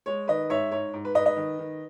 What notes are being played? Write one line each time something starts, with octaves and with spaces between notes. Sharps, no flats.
G#3 C#5
D#3 B4 D#5
G#2 C#5 E5
G#2 C#5
G#2
B4
G#2 B4 D#5
B4 D#5
D#3
D#3